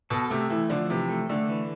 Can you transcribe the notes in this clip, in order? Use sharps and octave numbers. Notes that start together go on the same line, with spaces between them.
B2 A4
C3 A3
E3 A3
D3 F3
C3 E3
A3
D3 A3
E3